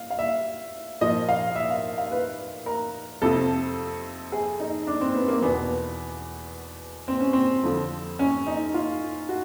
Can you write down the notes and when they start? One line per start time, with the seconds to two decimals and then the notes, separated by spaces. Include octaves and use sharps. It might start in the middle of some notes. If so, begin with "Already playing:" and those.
Already playing: F5
0.10 F5
0.19 E5
1.01 A#2 F3 D#5
1.29 F5
1.56 E5
1.70 F5
1.98 F5
2.11 B4
2.66 A#4
3.22 F2 C3 F3 A4
4.32 G#4
4.60 D#4
4.87 D4
5.01 C4
5.15 B3
5.28 A#3
5.42 E2 B2 B3
7.08 C4
7.20 C#4
7.33 C4
7.63 F2 D3 F3
8.19 C#4
8.47 D#4
8.74 F4
9.29 F#4